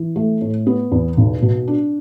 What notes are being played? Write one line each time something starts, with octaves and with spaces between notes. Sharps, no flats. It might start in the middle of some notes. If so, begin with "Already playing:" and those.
Already playing: E3
A3
A2
B3
E2
B1
B2
D4